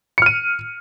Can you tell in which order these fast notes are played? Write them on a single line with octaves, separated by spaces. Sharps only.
C#7 F6 D#7